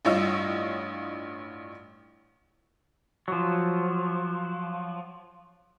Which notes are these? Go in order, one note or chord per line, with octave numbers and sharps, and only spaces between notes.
A1 G2 F4 C#5 D#5 E6
F3 F#3